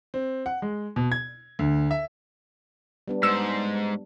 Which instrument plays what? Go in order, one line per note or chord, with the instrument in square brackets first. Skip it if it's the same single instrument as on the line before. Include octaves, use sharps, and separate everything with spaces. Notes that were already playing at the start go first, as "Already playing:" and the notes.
[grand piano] C4
F#5
G#3
B2
G#6
D2
E5
[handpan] G3 B3 D4
[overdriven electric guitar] G#2 [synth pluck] E6 E7